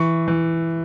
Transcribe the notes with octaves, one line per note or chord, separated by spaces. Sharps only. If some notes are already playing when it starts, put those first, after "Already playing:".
Already playing: E3 C#6
E3